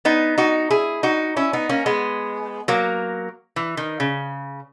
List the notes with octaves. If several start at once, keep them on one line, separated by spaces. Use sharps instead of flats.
B3 D#4
D#4 F#4
E4 G#4
D#4 F#4
C#4 E4
B3 D#4
A#3 C#4
G#3 B3
F#3 A#3
E3
D#3
C#3